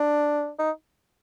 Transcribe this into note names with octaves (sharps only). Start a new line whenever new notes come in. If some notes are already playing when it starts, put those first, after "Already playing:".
Already playing: D4
D#4